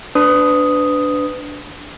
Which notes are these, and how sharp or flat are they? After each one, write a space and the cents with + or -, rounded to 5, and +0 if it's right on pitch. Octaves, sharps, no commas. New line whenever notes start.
D4 -5 B4 +30 D#6 +0